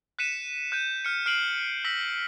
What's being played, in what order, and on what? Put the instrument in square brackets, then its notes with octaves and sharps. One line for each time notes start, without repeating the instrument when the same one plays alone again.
[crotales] F#6 B6 C#7 D#7 E7
F#6 G6 D#7
F6 C#7
F6 C7 D7 D#7 F#7
E6 A#6 B6 F#7